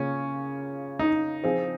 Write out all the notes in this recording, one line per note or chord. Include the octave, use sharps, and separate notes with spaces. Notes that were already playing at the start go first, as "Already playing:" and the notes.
Already playing: C#3 A#3 C#4 F4
D#4
F3 C4 F4 G#4